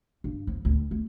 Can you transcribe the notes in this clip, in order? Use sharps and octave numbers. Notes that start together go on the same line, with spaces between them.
G2
F3
D2
A3